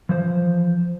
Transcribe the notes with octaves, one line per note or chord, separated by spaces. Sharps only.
E3 F3 C5